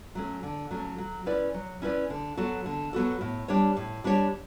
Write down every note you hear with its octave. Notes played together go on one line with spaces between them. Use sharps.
F#3 A3 C#4
D3
F#3 A3 C#4
F#3
C#4 E4 B4 D5
F#3
C#4 E4 B4 D5
D3
F#3 B3 F#4 A4
D3
F#3 B3 F#4 A4
A2
G3 D4 G4 C#5
A2
G3 D4 G4 C#5